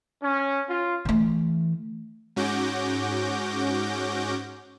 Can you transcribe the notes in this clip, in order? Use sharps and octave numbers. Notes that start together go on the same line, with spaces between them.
C#4
F4
E3 A3
G#2 C#4 F#4 D6 G6 A#6